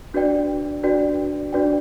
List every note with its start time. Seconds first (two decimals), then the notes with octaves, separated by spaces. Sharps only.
0.14 D4 F#4 B4 D5 G5
0.83 D4 F#4 B4 D5 G5
1.53 D4 F#4 B4 D5 G5